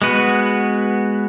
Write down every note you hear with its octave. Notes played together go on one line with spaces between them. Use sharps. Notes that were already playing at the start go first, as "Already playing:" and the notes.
G#3 B3 F#4 B4